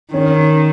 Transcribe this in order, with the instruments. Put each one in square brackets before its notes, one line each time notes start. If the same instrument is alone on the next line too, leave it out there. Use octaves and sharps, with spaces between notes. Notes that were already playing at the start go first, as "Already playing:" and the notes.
[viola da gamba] D#3 [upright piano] C#4